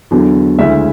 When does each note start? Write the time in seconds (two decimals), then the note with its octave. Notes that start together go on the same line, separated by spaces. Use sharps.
0.11 E2 D3 F#3
0.58 D2 C#3 G#3 C#4 E4 E5